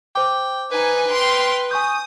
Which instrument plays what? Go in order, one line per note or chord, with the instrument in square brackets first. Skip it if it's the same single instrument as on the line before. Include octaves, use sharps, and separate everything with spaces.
[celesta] C5 D6 [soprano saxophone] G5
[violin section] D#4 G#5 [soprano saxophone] B4
[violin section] G5 C6 F6
[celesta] G#5 C#6 G6 [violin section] D#6